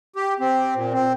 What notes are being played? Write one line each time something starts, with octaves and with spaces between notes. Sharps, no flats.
G4
C4
A#2
C4